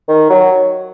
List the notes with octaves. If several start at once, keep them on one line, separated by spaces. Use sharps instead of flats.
D#3
F#3